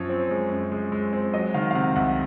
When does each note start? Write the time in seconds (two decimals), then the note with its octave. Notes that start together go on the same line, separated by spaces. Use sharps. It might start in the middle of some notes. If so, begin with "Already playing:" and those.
Already playing: F#2 F3 C#5
0.09 C4
0.31 G#3
0.51 F#2
0.72 G#3
0.92 G#3
1.13 C4
1.34 F#3 D#5
1.54 D#3 F5
1.71 F5
1.75 C3 F#5
1.96 C2 F#5